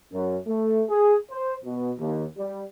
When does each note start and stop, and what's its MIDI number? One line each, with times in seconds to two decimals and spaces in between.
0.12 0.36 42
0.47 0.82 57
0.89 1.15 68
1.29 1.54 72
1.63 1.91 47
1.98 2.24 39
2.36 2.61 55